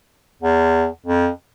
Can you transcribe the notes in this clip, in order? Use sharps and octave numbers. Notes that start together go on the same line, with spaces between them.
E2
F2